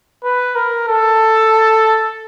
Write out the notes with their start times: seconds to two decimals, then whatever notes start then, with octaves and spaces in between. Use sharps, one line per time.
0.24 B4
0.55 A#4
0.88 A4